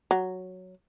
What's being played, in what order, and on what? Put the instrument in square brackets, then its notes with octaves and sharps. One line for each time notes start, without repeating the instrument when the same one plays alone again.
[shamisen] F#3